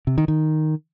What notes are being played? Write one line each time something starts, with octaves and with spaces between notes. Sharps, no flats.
C3
D#3
D#3